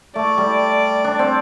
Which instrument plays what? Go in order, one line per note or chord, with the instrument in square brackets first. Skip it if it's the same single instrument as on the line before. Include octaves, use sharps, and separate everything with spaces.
[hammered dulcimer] A3 [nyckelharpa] D5
[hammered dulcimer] G3
D4
C4